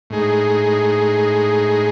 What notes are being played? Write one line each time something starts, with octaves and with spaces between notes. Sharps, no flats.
A2 G#3 D#4 G#4